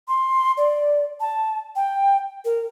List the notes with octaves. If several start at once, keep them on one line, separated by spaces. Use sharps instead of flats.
C6
D5
A5
G5
A#4